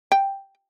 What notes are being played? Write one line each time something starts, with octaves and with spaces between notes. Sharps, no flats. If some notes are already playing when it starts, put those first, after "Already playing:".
G5